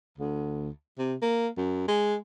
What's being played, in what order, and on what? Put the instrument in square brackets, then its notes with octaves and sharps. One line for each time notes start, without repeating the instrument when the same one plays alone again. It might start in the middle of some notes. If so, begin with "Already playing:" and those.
[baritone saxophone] D2
C3
A#3
F#2
G#3